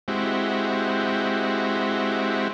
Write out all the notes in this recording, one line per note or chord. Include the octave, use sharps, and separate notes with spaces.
G#3 C4 E4 F#4 G4